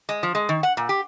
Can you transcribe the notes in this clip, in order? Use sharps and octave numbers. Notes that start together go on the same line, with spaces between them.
G#3
F3
G#3
D#3
F#5
A#2
G4